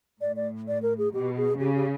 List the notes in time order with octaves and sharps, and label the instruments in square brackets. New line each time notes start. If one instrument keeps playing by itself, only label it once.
[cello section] A2 [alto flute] D5
[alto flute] D5
D5
A#4
G#4
[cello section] B2 [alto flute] G4
[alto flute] G#4
[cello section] C#3 [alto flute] G4
[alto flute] G4